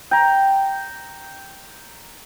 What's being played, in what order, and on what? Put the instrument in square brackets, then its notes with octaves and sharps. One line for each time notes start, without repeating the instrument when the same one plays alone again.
[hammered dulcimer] G5 A#5